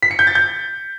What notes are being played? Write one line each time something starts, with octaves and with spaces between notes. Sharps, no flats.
B6
C#7
G6
A6
G6